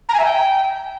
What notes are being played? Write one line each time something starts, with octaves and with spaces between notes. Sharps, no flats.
A#5
G#5
E5
G5